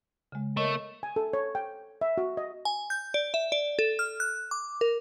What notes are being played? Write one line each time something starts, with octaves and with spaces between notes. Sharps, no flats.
C#3 G#3
A3 A#4 C#5 D#5
G#5
A4
C#5
G5
E5
F#4
D#5
G#5
G6
D5
E5
D5
A4
F6
F#6
D6
A#4